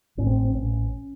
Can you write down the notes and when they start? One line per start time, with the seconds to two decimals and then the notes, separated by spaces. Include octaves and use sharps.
0.17 A1 A2 C#4
0.27 C4
0.45 C4
0.54 A1 A2 C#4